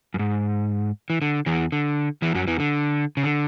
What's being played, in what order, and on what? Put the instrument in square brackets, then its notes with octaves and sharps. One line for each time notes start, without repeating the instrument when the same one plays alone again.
[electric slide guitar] F#2
G#2
E3
D3
E2 E3
D3
E2 E3
F#2 F#3
E2 E3
D3
C#3
D3